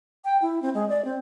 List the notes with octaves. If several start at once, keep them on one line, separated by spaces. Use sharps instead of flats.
G5
E4
C4
G#3
D5
C4